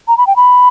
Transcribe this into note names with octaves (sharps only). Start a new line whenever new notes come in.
A#5
B5
G5
B5